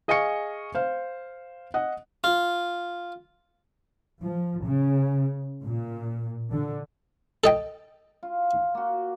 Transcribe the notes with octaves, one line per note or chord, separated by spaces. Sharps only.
G#4 D#5 F5 G#5 C#6 C#7
C5 F5
D#5 F#5
F4
F3
C#3
A#2
D3
A4 D#5 G5
F4
A#3 F#4